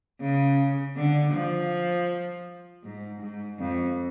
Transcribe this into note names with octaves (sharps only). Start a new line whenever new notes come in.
C#3
D3
F3
G#2
G#2
F2